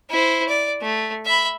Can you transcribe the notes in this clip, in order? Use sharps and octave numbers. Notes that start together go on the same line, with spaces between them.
E4 C5
D5
A3
E5 B5